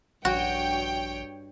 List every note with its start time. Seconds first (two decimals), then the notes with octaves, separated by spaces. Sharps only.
0.25 A#1 G2 F#4 C#5 G5